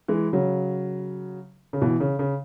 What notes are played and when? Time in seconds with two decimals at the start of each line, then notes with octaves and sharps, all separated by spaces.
0.08 E3 G#3
0.33 C#3 F#3
1.73 C#3
1.81 B2 E3
2.00 C#3
2.19 C#3